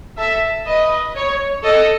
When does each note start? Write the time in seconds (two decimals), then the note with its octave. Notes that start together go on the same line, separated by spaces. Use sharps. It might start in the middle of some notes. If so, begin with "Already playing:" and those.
0.18 A4 E5
0.67 B4 D#5
1.16 C#5
1.64 A4 D#5